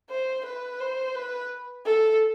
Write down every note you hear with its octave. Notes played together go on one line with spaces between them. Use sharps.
C5
B4
C5
B4
A4